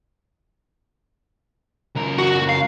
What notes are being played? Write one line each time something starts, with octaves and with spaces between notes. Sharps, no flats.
C#2 A#4
F#4
F5